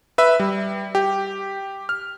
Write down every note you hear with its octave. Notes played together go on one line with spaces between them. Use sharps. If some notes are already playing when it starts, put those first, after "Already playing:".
B4 E5
G3
G4
F6